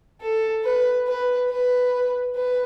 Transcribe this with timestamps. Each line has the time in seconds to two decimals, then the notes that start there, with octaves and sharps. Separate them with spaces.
0.21 A4
0.64 B4
1.07 B4
1.49 B4
2.35 B4